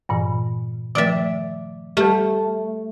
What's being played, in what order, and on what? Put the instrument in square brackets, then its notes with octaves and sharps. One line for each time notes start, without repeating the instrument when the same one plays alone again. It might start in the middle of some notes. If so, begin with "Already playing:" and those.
[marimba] G2 A#2 E3
[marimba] D#3 F3 A3 [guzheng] D5 E5
[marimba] G3 G4 [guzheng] A3